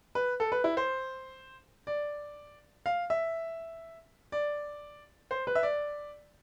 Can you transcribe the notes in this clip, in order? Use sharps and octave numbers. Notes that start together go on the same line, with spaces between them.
B4
A4
B4
E4
C5
D5
F5
E5
D5
C5
B4
E5
D5